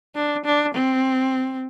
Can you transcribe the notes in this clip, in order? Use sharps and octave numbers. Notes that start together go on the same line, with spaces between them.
D4
D4
C4